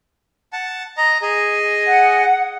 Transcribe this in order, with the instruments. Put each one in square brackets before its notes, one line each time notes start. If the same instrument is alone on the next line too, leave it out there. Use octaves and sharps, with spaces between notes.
[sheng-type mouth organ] F#5 A5
D#5 A#5
G#4 D#5 G#5
[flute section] F#5